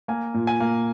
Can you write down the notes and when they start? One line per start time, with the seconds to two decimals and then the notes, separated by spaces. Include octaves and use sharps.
0.08 A#3 G#5
0.34 A#2
0.47 G#5
0.60 A#3